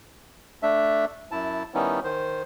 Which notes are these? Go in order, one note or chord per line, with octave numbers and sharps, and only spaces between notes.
A3 D4 E5
F#2 E4 A5
D#3 G3 B3 C#4 D#4 E4
D#3 C5